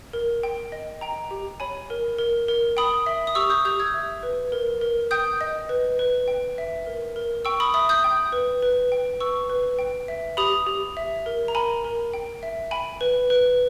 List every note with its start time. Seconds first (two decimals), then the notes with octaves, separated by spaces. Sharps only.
0.13 A#4
0.43 G5
0.72 D#5
1.01 G5 A#5
1.31 G4
1.60 C#5 G#5 B5
1.90 A#4
2.18 A#4
2.48 A#4
2.77 G5 B5 D#6
3.06 E5
3.27 D#6
3.35 G4 C#6 E6
3.50 D#6 G6
3.65 G4 D#6 G6
3.80 E6 G#6
3.94 E5
4.23 B4
4.52 A#4
4.81 A#4
5.11 G5 D#6 G6
5.41 D#5
5.69 B4
5.99 B4
6.28 G5
6.58 E5
6.86 A#4
7.16 A#4
7.45 G5 C#6 E6
7.60 B5 D#6
7.74 E5 B5 D#6
7.89 D#6 G6
8.04 G5
8.32 B4
8.62 B4
8.92 G5
9.20 B4 C#6 E6
9.50 B4
9.79 G5
10.08 E5
10.37 G4 B5 D#6
10.66 G4
10.97 E5
11.26 A#4
11.48 A#5
11.55 A#4 G#5 B5
11.84 A#4
12.14 G5
12.43 E5
12.71 G5 G#5 B5
13.01 B4
13.30 B4